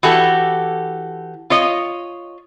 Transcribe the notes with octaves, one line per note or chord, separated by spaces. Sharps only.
E3 F#4 G4 A4
F4 C#5 D#5